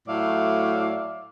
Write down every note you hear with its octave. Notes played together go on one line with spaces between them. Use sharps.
A2 F#3 A3 D5 E5 F5